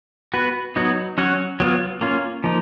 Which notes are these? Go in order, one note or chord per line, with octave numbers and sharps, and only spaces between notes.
B3 F#4 B4
F#3 B3 D#4 F#4
F#3 C#4 F#4 C#5
F#3 B3 F4
A#3 C#4 F4
F3 A#3 D#4